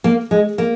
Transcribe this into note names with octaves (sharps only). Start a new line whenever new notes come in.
A#3
G#3
A#3